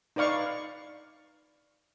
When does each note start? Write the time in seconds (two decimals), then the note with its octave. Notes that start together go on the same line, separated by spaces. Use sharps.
0.16 D#4 B4 D5 F5 C#6